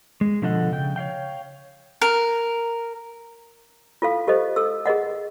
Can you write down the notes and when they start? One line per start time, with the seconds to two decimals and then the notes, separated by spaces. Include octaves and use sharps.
0.21 G#3
0.42 B2 D3 F3 A4 D#5 F#5
0.72 C#3 G5
0.96 C#5 D5 F5 G5
2.02 A#4
4.02 F4 A4 F5
4.27 G4 A4 C5 D#5
4.56 A4 E6
4.86 G#4 A#4 D#5 F#5